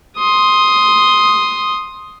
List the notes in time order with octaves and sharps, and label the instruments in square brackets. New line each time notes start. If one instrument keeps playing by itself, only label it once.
[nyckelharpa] C6 D#6